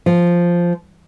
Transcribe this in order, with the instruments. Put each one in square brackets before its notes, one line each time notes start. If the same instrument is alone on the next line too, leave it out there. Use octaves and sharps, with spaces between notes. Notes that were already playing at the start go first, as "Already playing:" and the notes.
[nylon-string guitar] F3